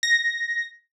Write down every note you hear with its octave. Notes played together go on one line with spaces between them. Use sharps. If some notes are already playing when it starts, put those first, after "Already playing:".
A#6